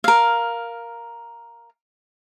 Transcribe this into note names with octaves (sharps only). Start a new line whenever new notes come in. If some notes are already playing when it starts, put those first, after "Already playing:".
A#4 F5